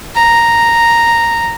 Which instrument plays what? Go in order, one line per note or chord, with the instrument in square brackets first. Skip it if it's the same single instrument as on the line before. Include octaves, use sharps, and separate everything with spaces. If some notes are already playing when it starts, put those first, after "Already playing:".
[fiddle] A#5